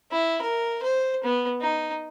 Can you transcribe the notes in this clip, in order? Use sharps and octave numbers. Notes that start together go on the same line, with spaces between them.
E4
A#4
C5
B3
D#4